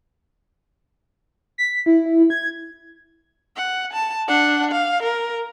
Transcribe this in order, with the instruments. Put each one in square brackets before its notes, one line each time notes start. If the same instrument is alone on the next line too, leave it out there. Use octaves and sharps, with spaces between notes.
[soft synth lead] B6
E4
E4
G#6
[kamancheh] F#5
A5
D4 F#5
F5
A#4